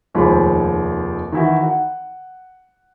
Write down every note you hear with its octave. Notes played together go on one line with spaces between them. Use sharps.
F1 D#2 F3 G#3 F4 B5
D#3 E3 E4 F#4
F#5